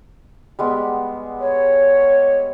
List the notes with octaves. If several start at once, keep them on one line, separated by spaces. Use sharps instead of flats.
G3 G#3 B3
C#5